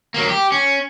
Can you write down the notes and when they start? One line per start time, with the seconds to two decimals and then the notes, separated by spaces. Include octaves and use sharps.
0.14 F#3 A#3
0.29 G4
0.52 C#4